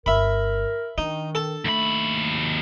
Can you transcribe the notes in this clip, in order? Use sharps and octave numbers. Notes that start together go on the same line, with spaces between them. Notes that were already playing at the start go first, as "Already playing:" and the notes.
G1 F4 A#4 E5 B5
D#3 D4 D#4
A4 A5
D#2 A3 B5